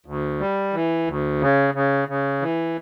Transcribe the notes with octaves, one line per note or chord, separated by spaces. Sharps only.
D2
G3
E3
D2
C#3
C#3
C#3
E3